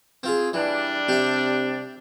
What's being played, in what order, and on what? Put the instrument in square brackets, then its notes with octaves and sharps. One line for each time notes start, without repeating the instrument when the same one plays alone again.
[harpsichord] C4 F4 G#4
[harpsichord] E3 [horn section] G3 D4
[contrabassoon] C3 [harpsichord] G4 E5